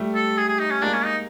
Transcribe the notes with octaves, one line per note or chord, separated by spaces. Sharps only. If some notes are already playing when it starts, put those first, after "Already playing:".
Already playing: G3 A3
A4
G#4
G#4
D#4
C#4
G#3 A#3 D4
C#4
D#4